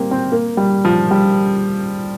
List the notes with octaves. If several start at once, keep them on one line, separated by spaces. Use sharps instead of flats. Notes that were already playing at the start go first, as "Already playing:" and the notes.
Already playing: G3 A#3 C4
C4
A#3
G3
F3
G3